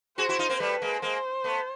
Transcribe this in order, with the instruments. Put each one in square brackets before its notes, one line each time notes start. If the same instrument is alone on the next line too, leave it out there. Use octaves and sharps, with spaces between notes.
[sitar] F#4 G#4 [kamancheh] C5
[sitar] E4 F#4
D#4 F4
A#3 C4
[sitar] G3 A3 [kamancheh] B4
[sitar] G#3 A#3
[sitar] G#3 A#3 [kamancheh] C5
[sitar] A3 B3